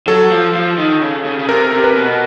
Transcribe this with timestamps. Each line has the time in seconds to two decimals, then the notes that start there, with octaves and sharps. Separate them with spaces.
0.07 F#3 A4
0.31 F3
0.55 F3
0.78 D#3
1.01 C#3
1.25 C#3
1.39 C#3
1.48 C3 A#4
1.72 C3
1.84 B4
1.96 B2